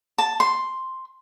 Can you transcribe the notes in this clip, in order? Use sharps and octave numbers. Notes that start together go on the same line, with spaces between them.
A5
C6